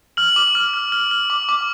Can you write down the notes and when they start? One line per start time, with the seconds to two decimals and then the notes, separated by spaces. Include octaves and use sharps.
0.17 F6 F#7
0.36 D6
0.55 F6
0.74 F6
0.92 F6
1.11 F6
1.30 D6
1.49 D6